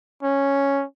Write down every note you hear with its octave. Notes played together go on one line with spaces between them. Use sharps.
C#4